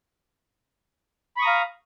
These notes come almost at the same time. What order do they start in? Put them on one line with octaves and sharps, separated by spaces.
B5 C#6 D#6 A#5 F5